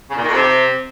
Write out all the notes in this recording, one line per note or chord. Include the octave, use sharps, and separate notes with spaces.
C#3
A#2
D#3
F2
C3